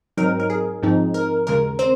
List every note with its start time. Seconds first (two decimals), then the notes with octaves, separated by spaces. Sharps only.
0.17 G#2 F#3 C4 D#4 A#4
0.40 A#4
0.50 G#4
0.82 G#2 F3 C4 D#4
1.14 A#4
1.47 D#2 C#3 G#3 A#4
1.79 C4 C5